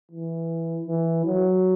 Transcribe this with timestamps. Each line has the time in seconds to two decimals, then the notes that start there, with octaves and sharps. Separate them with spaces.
0.12 E3
0.87 E3
1.25 F#3